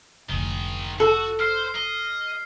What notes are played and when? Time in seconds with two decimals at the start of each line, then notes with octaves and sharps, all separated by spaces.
0.29 F1 D2 D#3 G#4
1.00 F#4 A4
1.40 C5 F6 C7
1.75 D#5